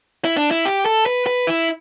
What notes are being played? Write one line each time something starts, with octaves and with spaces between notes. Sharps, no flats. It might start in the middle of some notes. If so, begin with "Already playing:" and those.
E4
D4
E4
G4
A4
B4
B4
E4